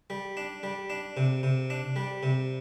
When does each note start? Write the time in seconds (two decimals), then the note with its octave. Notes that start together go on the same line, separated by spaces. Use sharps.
0.10 G3
0.37 D4
0.63 G3
0.90 D4
1.17 C3
1.43 C3
1.70 D4
1.96 G3
2.23 C3